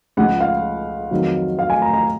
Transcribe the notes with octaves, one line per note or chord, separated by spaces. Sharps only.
C#2 C#3 F3 F#5
F5
F2 D#3 F#3
F5
G#5
A#5
A#5